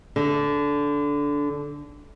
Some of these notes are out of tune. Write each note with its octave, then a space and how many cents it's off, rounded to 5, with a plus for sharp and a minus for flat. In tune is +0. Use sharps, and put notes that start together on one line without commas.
D3 -15